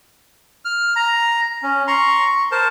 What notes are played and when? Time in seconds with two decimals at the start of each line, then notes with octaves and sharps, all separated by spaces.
0.65 F6
0.96 A#5
1.63 C#4
1.87 A#5 C6 C#6
2.26 C#6
2.52 A#4 C5 A5